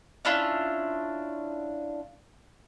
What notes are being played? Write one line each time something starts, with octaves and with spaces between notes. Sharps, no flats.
C#4 D4 E4 F4